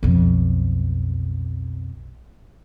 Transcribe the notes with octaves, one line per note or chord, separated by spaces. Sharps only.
B1 F2